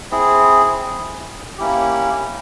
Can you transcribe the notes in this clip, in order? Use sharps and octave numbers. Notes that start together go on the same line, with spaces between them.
C4 E4 G#4
A#3 C#4 E4 G4